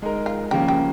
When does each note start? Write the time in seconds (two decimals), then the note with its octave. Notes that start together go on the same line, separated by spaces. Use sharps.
0.02 G#3 D#4 A#4
0.26 F4
0.51 C#3 F3 A#3 C#4 G4
0.68 G4